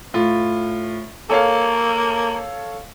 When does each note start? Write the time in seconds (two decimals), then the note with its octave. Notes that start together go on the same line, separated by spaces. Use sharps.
0.14 A2 F4
1.30 A#3 A4 C#5 F5